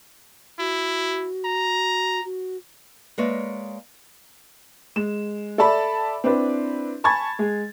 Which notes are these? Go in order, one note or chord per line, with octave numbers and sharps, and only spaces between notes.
E4 F#4
A#5
F#4
G#3 A#3 B4 C#5 D5 E5
G#3 E7
A4 D5 E5 A5 B5
C4 D4 E4 B4
G#5 A5 B5 C#6 G#6 A6
G#3 G#4